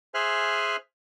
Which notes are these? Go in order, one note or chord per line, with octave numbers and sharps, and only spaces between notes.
G#4 C5 E5 G#5 F6 F#6